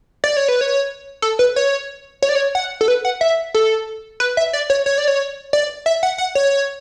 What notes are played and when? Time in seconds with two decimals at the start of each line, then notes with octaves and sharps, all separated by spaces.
0.24 D5
0.37 C#5
0.48 B4
0.61 C#5
1.22 A4
1.39 B4
1.56 C#5
2.22 C#5
2.29 D5
2.35 C#5
2.55 F#5
2.81 A4
2.88 B4
3.05 F#5
3.21 E5
3.54 A4
4.20 B4
4.37 E5
4.53 D5
4.70 C#5
4.86 C#5
4.98 D5
5.08 C#5
5.53 D5
5.86 E5
6.03 F#5
6.18 F#5
6.35 C#5